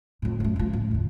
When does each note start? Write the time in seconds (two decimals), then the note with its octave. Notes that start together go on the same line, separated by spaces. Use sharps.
0.22 F2 A2
0.40 F#2 A3
0.56 F#2 F3
0.73 A2 F3
0.91 E2 D3